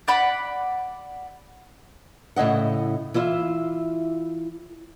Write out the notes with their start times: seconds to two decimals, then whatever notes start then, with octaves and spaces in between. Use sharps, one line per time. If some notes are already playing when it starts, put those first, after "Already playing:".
0.08 D5 F#5 B5
2.36 A2 C#3 E4 D#5 F#5
3.14 E3 E4 F4 E5